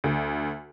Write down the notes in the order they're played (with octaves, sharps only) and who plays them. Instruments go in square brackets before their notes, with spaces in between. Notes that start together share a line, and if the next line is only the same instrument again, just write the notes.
[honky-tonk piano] D2